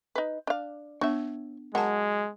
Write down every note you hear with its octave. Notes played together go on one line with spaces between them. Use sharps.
D#4 B4
D4 F5
B3 D4 C#5 E5
F#3 G#3 A#4 F#5 A5